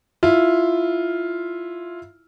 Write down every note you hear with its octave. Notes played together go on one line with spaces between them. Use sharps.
E4 F4